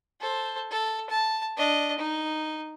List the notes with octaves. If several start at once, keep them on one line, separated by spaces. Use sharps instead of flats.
A4 C5
A4
A5
D4 D#5
D#4